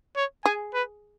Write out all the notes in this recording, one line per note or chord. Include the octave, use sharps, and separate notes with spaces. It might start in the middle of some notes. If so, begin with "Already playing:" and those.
C#5
G#4 G#5
B4